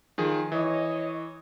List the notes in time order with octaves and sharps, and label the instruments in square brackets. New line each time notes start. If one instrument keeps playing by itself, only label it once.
[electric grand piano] D#3 F3 G#4
[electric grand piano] E3 [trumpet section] C#5 D#5